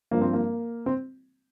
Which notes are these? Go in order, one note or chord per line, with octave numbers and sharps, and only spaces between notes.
G2 F3 A#3
C4
A#3
C4